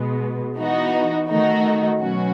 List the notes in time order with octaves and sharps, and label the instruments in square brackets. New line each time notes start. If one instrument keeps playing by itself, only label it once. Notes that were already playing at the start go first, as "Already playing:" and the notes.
Already playing: [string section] B2 G#3 B3
E3 B3 D#4 F#4
D#3 A3 D#4 F#4
B2 F#3 C#4 F#4